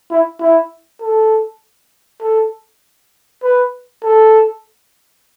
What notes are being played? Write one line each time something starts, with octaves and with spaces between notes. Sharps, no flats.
E4
E4
A4
A4
B4
A4